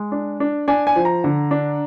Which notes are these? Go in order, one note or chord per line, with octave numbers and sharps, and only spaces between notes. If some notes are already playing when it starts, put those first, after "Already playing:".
Already playing: G#3
D4
D4
D4 G#5
G#5
F3
A#5
D3
D4